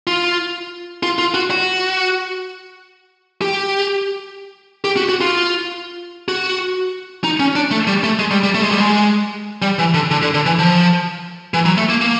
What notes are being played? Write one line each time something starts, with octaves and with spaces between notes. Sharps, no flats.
F4
F4
F4
F#4
F#4
G4
G4
F#4
F#4
F4
F#4
D#4
C#4
D4
A3
G3
A3
G#3
G3
G3
A3
G#3
G3
G#3
G3
E3
D3
D3
D3
D3
E3
F3
E3
F#3
A3
A#3
A#3